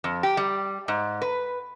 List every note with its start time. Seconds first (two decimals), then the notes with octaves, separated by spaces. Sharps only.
0.04 F2
0.23 G4
0.37 G3
0.88 G#2
1.22 B4